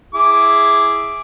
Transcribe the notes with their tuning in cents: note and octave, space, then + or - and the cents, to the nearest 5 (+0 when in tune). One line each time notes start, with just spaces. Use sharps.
E4 +0 G#4 +0 D6 +0